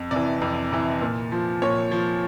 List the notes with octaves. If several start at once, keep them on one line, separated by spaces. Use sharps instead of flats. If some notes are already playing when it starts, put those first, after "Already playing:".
Already playing: F2
C3 E3 D5
F2
C3 E3
A#2
F3
A#2 C#5
F3